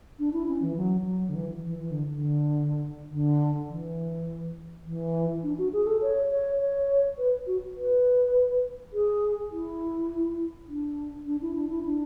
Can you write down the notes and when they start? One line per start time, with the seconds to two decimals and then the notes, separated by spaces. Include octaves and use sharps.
0.19 D4
0.33 E4
0.48 C#4
0.62 E3
0.76 F#3
1.05 F#3
1.29 D3
1.35 E3
1.64 E3
1.79 E3
1.91 D3
2.13 D3
3.09 D3
3.69 E3
4.85 E3
5.43 D4
5.58 F#4
5.73 G#4
5.86 A4
6.02 C#5
6.31 C#5
6.61 C#5
7.18 B4
7.47 F#4
7.76 B4
8.93 G#4
9.52 E4
10.68 D4
11.26 D4
11.42 E4
11.56 D4
11.70 E4
11.85 D4